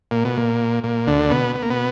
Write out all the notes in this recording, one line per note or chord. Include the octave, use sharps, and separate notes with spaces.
A#2
B2
A#2
A#2
D2 D3
B2 B3
B3
A#3
B2 B3